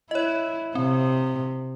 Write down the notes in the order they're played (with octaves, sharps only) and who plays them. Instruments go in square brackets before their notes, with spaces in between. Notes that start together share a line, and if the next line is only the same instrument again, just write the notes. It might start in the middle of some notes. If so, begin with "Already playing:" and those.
[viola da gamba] E4 [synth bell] C#5 D#5
[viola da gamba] C3 [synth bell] C4